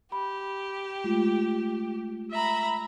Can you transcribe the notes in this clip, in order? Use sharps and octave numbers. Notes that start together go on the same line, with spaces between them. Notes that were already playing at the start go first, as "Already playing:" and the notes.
G4 B5
G#3 A3 F4
E5 A#5 B5